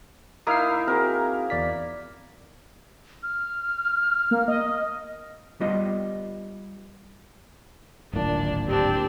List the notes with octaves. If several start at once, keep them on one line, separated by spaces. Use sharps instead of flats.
A#3 D#4 E4 D#6 F6 C7
C4 F#4 G#4 A#4
E2 D5 B6
F6
A#3
D#5
G3 B3 F4 D#5
D1 G#1 A#2 D4
C4 D4 G4